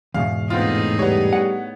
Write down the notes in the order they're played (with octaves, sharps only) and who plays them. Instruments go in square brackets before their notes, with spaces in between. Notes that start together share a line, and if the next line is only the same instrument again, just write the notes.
[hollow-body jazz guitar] E2 G#2 B2 [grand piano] F5
[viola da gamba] A2 D#4 G#4 [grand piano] B3 C4 F4
[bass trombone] G3 [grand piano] B3 C#5
[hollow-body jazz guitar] F#5